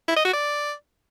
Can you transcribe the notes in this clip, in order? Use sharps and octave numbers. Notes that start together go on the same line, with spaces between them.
E4
D#5
F#4
D5